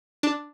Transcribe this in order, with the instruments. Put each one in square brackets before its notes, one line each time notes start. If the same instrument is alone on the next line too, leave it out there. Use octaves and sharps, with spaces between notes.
[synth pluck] D4